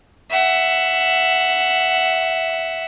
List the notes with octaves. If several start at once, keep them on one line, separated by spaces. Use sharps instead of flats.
E5 F#5